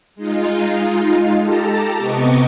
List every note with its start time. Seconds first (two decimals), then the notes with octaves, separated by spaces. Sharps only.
0.16 G#3 D#4 F4
1.39 G4 A4 A5 A#5
1.98 C3 B3 D#5 C#6 D6